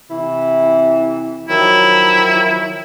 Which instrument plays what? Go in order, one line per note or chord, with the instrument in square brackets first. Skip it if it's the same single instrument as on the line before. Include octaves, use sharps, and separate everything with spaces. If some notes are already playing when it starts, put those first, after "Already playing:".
[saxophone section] C3 E3 E4
[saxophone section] D#3 F3 F#3 [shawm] E4